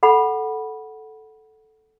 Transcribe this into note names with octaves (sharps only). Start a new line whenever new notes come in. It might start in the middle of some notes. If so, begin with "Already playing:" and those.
A4 F#5 B5